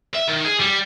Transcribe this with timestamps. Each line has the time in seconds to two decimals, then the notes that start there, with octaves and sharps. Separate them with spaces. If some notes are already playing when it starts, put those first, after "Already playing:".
0.15 E5
0.28 D#3
0.45 G#4
0.60 G3